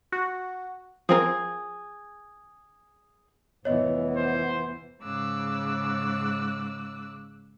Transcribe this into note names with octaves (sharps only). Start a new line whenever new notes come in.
F#4
F3 C4 G#4 A#4
F1 E3 B3 C#5 D#5
C5
G#2 C#3 D6 E6 F#6